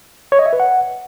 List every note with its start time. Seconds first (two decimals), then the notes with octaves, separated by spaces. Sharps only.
0.32 C#5
0.39 D#5
0.46 E5
0.53 B4
0.60 F#5